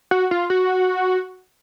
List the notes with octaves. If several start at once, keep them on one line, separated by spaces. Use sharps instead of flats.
F#4
F4
F#4